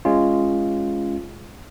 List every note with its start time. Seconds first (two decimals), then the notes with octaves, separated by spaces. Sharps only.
0.05 G#3 C#4 F4